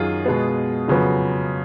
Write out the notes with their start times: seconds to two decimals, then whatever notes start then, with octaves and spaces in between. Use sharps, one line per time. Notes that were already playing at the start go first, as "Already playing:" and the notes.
Already playing: F#2 D#3 F#3 F4 G#4
0.25 B2 G#3 B3
0.88 F2 C#3 F#3 B3